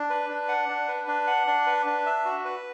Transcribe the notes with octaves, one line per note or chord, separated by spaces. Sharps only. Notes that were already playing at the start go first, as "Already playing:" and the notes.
Already playing: D4
B4
D4
F#5
D4
B4
D4
F#5
D4
B4
D4
E5
F#4
B4